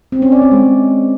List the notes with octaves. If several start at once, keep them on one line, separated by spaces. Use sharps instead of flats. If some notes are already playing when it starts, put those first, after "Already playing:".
C4
C#4
D5
C4
G#3